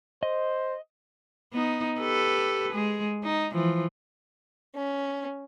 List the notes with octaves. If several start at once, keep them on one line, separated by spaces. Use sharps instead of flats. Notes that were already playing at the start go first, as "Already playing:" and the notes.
C5 D#5
B3 D#4
G4 A4 B4
G#3 G#4
D#4
E3 F3
C#4